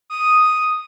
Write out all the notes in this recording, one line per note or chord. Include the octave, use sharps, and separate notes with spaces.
D#6